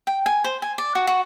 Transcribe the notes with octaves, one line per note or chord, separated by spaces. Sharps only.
G5
G#5
C5
G#5
D5
F#4
F#4